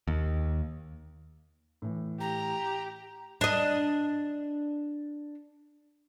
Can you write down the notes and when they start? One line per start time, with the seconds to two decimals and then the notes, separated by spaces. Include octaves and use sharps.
0.08 D#2
1.82 A2 E3
2.20 G4 A#5
3.41 D4 D#5